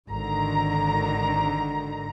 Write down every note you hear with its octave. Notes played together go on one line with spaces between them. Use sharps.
G#1 D3 D#3 A#5